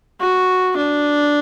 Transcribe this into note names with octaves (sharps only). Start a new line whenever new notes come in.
F#4
D4